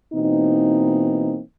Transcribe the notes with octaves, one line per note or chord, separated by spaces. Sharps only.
B2 E3 A#3 C4 D#4